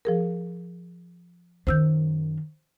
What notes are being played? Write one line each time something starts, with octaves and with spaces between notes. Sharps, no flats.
F3 G#4 A#4
F#2 D#3 C5 E6 G6